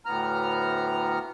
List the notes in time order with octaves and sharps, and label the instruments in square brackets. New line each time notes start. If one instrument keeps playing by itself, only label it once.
[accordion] D2 A2 B3 A#5 F6